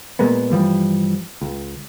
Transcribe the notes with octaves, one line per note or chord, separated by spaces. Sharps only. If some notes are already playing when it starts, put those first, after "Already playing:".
A#2 G#3 A#3 B3
G2 E3 F3 G3
C#2